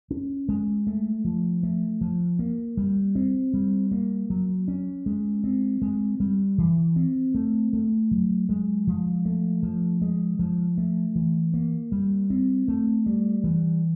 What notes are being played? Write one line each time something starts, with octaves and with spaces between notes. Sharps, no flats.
C#4
G#3
A3
F3
A3
F3
A#3
G3
C4
G3
A#3
F#3
C#4
G#3
C4
G#3
G3
E3
C4
A3
A3
F#3
G#3
F3
A3
F3
G#3
F3
A3
E3
A#3
G3
C4
A3
G3
E3